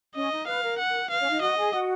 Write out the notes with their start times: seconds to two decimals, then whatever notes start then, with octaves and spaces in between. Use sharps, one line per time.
0.15 C#4 D#5
0.31 D#4
0.46 B4 F5
0.63 A#4
0.79 F#5
0.89 A#4
1.10 B4 F5
1.20 C#4 C#5
1.30 D#4 D#5
1.41 F#4 D#5 F#5
1.57 G#4 G#5
1.73 F#4 F#5